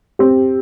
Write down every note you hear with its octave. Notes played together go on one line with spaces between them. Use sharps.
C4 G4